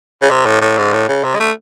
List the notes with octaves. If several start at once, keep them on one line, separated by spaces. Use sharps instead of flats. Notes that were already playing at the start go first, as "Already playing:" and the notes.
C#3
C3
A2
A2
G#2
A2
C#3
C3
G#3
A3